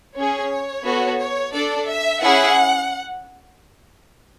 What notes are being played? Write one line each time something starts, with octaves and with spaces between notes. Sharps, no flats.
C#4 G#4 C#5
B3 F#4 A4
C#5
D4 A4 D5
E5
C#4 E4 G#4 F#5